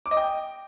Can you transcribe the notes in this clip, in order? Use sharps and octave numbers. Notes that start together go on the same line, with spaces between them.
D6
D#5
G5